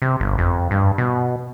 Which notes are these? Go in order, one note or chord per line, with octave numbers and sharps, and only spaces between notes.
C3
G1
F2
G2
B2